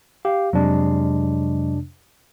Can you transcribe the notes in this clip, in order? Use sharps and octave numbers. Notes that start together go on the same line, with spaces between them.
G4 F5
F2 C3 F#3 G#3 D4